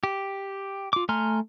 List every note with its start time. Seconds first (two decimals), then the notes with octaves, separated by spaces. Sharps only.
0.03 G4
0.93 F4 D6
1.09 A3 G#5 A#5 C6 F6